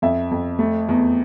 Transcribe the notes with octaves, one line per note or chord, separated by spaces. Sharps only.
F2 E5
F2
A3
E2